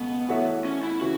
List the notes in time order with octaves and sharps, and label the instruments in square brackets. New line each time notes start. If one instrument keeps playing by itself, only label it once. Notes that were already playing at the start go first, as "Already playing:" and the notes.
Already playing: [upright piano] C#2 B2 A3 [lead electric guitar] B3
[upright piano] E3 A3 F#4 C#5 E5
[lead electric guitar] C#4
E4
[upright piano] C#3 E3 [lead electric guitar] F#4